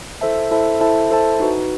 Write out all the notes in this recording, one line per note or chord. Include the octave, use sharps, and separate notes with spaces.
E4 A4 C5 E5 A5
E4 A4 C5 E5 A5
E4 A4 C5 E5 A5
E4 A4 C5 E5 A5
D#4 F#4 B4